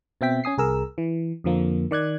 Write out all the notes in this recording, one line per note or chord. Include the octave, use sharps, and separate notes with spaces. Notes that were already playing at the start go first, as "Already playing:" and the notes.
B2 C4 E5 G5 B6
C#4 G#5 D#6 C7
C2 G#4 A#4 E6
E3
F2 D3 F3 A#3
D#3 D5 F#6 G#6